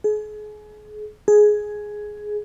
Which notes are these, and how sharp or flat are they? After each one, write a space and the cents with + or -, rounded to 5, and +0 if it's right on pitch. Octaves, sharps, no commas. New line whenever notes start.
G#4 +35
G#4 +10